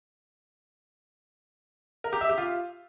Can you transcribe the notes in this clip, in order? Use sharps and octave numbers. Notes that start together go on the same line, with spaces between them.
A#4
G4
E5
G4
F4